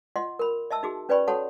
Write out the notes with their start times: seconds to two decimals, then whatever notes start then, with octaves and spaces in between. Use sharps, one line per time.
0.16 F4 D#5 F#5 C6
0.39 A#4 B5
0.71 D#5 E5 A5 E6
0.83 D#4 F#4 G#4
1.09 C#4 B4 D5 G5 B5 C#6
1.28 F#4 A4 C#5 F#5 A5 B5